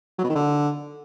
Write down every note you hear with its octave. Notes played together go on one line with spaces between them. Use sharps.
F#3
B2
D#3
D3